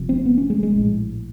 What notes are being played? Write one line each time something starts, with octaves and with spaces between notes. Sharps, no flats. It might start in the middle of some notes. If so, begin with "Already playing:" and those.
Already playing: F1 F2 C3
C4
B3
C#4
G#3
G#3
A#1 A2